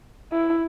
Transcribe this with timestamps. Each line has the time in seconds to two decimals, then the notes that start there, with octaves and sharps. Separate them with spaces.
0.32 E4